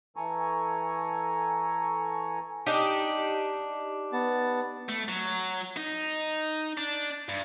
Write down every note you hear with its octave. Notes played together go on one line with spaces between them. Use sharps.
E3 A4 G#5 A#5 C#6
D4 D#4 G4
B3 A5
A3
F#3
D#4
D4
G2